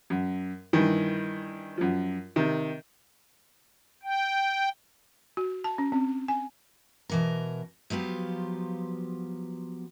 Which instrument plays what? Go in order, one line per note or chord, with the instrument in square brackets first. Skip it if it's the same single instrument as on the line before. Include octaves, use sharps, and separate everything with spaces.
[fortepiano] F#2
G2 D#3 E3
F#2 F3
C3 D#3
[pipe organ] G5
[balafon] F#4
A5
C#4
C4
G#5
[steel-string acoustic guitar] B2 E3 A#4
F3 F#3 B3 F4 G4